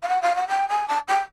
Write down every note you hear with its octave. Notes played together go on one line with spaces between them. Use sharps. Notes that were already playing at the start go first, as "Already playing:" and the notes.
F5
F#5
F5
F#5
G5
G#5
A5
G5